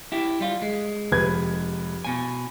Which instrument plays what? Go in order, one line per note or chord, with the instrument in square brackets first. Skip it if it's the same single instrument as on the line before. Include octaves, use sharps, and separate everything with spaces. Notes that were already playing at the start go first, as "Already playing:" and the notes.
[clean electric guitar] E4 G4
G3 F4
G#3
[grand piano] F1 B4 G#6
[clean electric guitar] B2 G#5